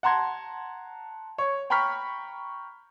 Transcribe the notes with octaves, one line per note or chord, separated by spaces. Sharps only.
F#5 A5 A#5 C6 G#6
C#5
G5 A#5 B5 C#6 F6 B6